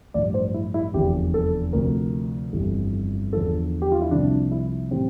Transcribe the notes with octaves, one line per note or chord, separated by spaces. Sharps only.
A1 G2 F3 D5
C5
E4
E4
F1 E2 D3 F3 G4
A4
D2 C3 F3 A#4
G1 F2 E3 G3
E2 D3 F3 A4
G4
F4
E4
C2 C3 F3 D4
E4
A2 E3 G3 C4